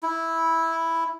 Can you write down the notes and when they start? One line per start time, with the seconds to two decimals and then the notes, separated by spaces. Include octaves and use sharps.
0.03 E4